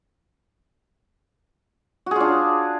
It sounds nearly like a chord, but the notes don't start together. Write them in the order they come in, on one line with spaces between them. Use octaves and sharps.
F#4 G#4 F4 D4